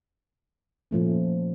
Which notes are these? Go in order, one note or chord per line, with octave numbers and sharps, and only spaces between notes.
A#2 F3 A3 C#4